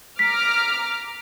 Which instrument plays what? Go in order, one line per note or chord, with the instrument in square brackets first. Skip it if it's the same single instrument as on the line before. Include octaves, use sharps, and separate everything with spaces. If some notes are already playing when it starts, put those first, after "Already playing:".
[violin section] A#5 D6 F6 [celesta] B6